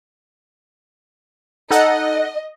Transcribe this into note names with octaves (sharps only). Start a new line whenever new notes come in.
D#4 A4 D#5 F#5